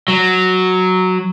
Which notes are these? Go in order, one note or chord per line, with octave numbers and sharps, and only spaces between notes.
F#3